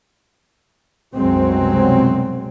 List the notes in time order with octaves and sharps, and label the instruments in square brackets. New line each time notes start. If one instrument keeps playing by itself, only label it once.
[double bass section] C2 F#2 B2 F#3 G#3 C4